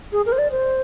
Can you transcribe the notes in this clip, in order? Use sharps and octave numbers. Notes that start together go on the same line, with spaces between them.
G#4
A#4
C5
D5
C5